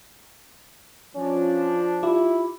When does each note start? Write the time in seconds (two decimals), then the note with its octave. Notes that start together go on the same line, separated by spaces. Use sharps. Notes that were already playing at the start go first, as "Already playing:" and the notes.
1.15 F3 C#4 D4
2.03 E4 F4 G4 D6